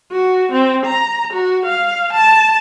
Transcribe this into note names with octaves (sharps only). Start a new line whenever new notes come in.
F#4
C4
A#5
F#4
F5
A5